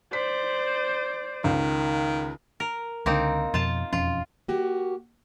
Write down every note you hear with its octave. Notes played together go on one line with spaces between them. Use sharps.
C5 D5 B6
C#2 D#3
A#4
C#2 D3 A#3 C4 D#4
F2 B2 F4 A5
E1 F2 C#4 F4
A#3 F#4 G4